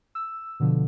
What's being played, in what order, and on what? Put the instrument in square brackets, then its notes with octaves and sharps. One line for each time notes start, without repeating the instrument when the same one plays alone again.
[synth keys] E6
B2 D3 F3